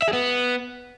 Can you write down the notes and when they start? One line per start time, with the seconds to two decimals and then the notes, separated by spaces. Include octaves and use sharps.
0.02 E5
0.08 G#4
0.13 B3